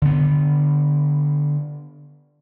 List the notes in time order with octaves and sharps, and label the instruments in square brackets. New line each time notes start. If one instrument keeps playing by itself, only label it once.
[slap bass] D3 B3